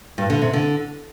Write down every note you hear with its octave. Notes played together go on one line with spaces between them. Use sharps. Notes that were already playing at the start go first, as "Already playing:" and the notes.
G2
D3
C3
D3